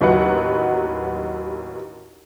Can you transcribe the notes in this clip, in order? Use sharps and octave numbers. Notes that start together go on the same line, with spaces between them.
A1 D#2 F#3 D#4 B4 F#5